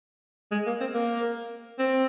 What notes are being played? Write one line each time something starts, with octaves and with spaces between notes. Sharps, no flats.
G#3
A#3
C4
A#3
C4